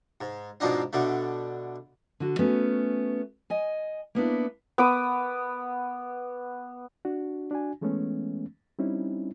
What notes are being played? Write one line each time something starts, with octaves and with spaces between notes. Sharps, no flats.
G#2
G#2 B2 F3 C4 D4 D#4
B2 D3 A3
D3 F#4
A3 B3 C#4 F#4
D#5 G#5
A#3 B3 D4 E4
B3 D6 D#6
D4 F#4
D4 F#4 G#5
E3 G#3 A3 B3 C#4
G3 C4 C#4 D#4 E4